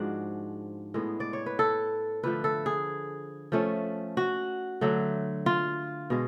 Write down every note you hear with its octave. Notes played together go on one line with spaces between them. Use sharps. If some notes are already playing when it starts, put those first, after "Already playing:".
Already playing: G#2 F3 G#3 D4 F#4
A2 G#3 B3
D5
C#5
B4
A4
D3 F3 A3 B4
A4
G#4
F3 A3 C#4
F#4
D3 F#3 A3
F4
B2 G#3